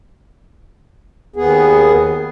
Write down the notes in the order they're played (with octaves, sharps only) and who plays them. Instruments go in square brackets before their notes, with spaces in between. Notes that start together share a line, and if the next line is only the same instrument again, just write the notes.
[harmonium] D#2 B3 G#4